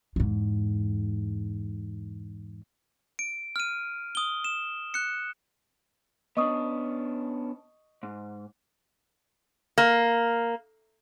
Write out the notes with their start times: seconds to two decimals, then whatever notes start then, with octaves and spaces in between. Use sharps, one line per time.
0.16 E2 G#2
3.19 D7
3.56 F6 D#7
4.15 D#6 G7
4.44 E7
4.94 F#6 C#7
6.37 B3 C#4 D4 D#5 C#6 D#6
8.03 G#2
9.78 A#3